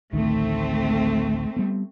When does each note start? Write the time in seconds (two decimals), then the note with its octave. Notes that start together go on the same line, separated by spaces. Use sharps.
0.13 A1 D2 D#3 A3 C4
1.57 G3 B3